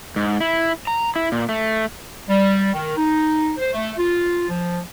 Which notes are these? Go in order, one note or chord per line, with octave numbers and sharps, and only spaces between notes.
G#2
E4
A#5
E4
A#2
A3
G3
D#3
D#4
C5
A3
F4
F3